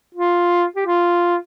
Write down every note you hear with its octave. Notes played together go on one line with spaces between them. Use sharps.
F4
G4
F4